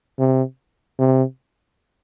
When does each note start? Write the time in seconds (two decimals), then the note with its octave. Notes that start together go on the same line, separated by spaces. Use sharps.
0.19 C3
0.99 C3